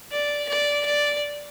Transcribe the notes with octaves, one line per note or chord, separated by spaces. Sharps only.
D5
D5
D5